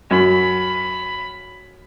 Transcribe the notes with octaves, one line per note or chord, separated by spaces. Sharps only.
F#2 B5